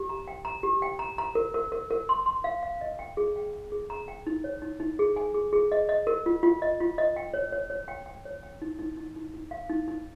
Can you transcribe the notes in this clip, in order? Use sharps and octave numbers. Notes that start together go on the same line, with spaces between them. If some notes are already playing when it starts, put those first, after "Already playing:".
Already playing: G4
A#5
G5
A#5
G4
G5
A#5
A#5
A#4
A#4
A#4
A#4
C6
C6
F5
F5
D#5
G5
G#4
G5
G5
G#4
A#5
G5
D#4
C#5
D#4
D#4
G#4
G#5
G#4
G#4
D#5
D#5
A#4
F4
F4
D#5
F4
D#5
G5
C#5
C#5
C#5
G5
G5
C#5
G5
D#4
D#4
D#4
D#4
D#4
F5
D#4
D#4